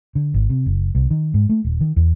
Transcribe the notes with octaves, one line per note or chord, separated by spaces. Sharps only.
D3
G#1
C3
F#1
C2
D#3
G#2
A3
D#1
D#3
E2